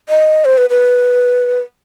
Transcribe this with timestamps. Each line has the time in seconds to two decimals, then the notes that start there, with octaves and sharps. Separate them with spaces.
0.09 D#5
0.45 C5
0.58 B4
0.70 B4